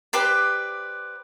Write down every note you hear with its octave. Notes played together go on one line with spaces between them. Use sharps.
G4 B4 C5 D5